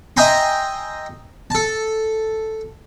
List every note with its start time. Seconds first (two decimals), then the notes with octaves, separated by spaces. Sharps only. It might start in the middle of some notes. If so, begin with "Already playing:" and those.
0.17 D#5 E5 G5 G#5 A#5 C6
1.50 A4 A5